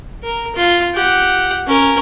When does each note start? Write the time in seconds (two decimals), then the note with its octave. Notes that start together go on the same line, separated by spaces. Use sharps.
0.23 A#4
0.55 F4
0.94 G4 F#5
1.67 C#4 A#4